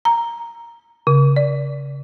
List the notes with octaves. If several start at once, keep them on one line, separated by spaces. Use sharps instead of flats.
A#5
C#3
D5